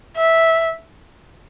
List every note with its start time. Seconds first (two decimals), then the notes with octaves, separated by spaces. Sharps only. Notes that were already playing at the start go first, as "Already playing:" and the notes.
0.17 E5